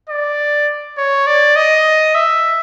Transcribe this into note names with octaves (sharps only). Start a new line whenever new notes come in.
D5
C#5
D5
D#5
E5